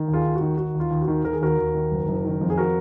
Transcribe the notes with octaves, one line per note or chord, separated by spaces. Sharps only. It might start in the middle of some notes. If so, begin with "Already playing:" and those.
Already playing: D#3
D#2
F4 G#4
D#2
F#4
D#3
D#3 F#4
D#2 F4
D#2
F#4
D#3
D#3 A#4
G#4
D#2 F#4 A#4
D#2
D#3
F#1
F#1
D#3
F2
G#4
F#4 A#4